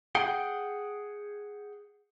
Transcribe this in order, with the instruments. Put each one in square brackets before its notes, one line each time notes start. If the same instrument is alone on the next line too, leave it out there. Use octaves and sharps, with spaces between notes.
[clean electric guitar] G#4 F#5 G5